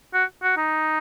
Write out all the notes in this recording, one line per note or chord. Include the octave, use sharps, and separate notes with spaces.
F#4
F#4
D#4